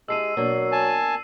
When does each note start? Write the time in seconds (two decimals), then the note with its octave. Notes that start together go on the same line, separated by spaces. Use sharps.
0.08 G#3 E4 G4 A5 E6 C7 D#7
0.37 B2 F#3 A#3 D4
0.72 G#5 A5